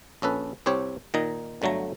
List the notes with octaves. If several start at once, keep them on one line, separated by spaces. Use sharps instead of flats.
A#1 C#4 A4 B4
C2 C4 G4 C#5
A#2 D#3 D#4 A#5
G1 D3 F#3 A3 A#5